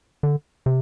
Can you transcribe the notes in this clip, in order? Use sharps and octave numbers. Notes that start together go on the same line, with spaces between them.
D3
C3